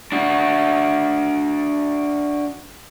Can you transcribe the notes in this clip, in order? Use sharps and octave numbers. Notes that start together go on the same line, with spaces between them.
D4 F#4